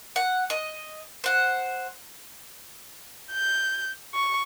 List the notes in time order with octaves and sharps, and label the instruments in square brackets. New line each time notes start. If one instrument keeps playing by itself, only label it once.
[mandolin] F#5
D#5
C5 F#5
[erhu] G6
C#6